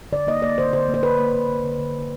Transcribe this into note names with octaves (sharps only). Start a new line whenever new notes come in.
D3 D5
A#3 D#5
A#3 D5
D3 C5
D3 C5
A#3
C5
D3 B4
A#3
D3
D3
D3
D3
D3